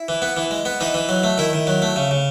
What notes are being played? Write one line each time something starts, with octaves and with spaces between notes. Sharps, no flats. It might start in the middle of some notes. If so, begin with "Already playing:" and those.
Already playing: E4
E3
B3
E3
G#3
B3
E3 D#4
E3
F#3
A3
D#3 E4
D#3
F#3
A3
C#3
C#3